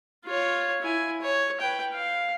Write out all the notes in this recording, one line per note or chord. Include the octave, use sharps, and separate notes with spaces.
F4 C#5
E4 G#5
C#5
B4 G5
F5